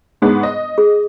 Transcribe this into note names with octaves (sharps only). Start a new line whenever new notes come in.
G#2 G#3 B3
D#5
G#4